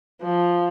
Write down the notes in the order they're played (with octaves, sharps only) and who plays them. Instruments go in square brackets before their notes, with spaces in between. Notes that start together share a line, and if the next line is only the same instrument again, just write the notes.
[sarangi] F3